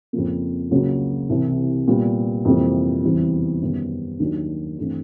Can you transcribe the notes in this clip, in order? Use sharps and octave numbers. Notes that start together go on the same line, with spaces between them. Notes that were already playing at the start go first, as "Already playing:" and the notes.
F2 C#3 F3 A#3
C#2 C#3 F#3 A#3
C2 C3 E3
A#2 G3 B3
F2 C3 E3 G3 A#3
E2 C#3 E3 G3 C4
F#2 D#3 G3 B3
D#2 D#3 F#3 A#3 D4
G2 E3 A3 C4